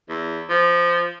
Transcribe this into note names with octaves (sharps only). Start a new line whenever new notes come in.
E2
F3